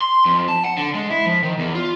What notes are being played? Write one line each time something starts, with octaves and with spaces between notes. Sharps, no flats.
C6
F2
A5
F#5
D3
G#3
E4
F3
D#3
E2
F4